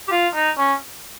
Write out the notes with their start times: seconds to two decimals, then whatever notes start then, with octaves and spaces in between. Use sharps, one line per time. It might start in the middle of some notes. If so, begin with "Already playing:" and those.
0.08 G4
0.12 F4
0.34 D#4
0.58 C#4